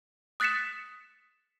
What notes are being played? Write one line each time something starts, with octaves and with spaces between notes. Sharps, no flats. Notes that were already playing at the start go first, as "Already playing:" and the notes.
D#6 F#6 A6 B6 C#7 E7